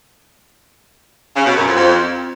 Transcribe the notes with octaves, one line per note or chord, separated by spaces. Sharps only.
C#3
B2
F#2
F2
F2